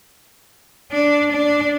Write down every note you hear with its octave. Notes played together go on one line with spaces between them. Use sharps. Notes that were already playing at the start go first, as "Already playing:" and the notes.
D4
D4